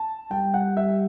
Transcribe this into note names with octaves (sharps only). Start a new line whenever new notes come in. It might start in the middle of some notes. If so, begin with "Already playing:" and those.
Already playing: A5
G3 G5
F#5
E5